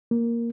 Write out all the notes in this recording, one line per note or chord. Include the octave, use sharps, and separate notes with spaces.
A#3